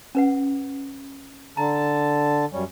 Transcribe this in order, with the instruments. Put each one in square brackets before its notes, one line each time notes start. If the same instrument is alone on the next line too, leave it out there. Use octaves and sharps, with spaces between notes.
[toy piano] C#4 B4 F#5
[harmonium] D3 A5 [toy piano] A#5
[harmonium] F#2 G3 C#4